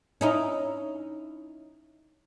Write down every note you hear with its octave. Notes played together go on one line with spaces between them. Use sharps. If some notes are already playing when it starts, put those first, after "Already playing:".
C#4 D#4 E4